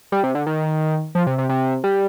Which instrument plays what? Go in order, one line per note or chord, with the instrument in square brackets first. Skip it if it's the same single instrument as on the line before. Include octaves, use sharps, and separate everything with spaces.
[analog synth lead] G3
C3
D3
D#3
F3
C3
C3
C3
G3